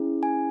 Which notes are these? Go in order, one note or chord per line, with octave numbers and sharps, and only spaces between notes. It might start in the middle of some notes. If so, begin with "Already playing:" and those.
Already playing: C#4 E4 G#4
G#5